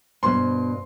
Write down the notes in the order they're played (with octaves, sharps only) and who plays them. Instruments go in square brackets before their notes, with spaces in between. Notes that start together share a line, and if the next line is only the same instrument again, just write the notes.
[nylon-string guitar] G2 B2 [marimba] C5 [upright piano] C6